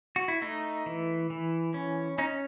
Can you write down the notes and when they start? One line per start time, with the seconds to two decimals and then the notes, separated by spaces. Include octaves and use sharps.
0.16 F#4
0.28 E4
0.42 A3 D#4
0.86 E3
1.30 E3
1.74 C#4
2.18 C#4 D#4